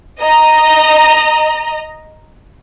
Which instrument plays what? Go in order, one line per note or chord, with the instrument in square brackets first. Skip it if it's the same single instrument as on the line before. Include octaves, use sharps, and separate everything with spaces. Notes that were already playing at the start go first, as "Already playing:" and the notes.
[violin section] D#5 A#5